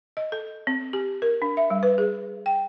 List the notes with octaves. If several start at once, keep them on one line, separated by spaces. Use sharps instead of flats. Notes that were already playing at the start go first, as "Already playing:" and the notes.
D#5
A4
C4
G4
A#4
D4
E5
G3
B4
G#4
G5